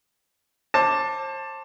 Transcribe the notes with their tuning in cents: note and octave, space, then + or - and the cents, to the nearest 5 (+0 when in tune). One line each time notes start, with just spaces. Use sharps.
C5 +35 A5 +10 D6 +0